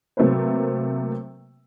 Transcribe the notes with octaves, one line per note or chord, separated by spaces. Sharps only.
C3 F#3 A3 A#3 B4 C5